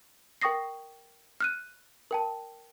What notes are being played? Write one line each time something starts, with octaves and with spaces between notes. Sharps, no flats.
A#4 G5 C#6 D#6 A#6 C7
F6 F#6 D#7
A#4 G5 A5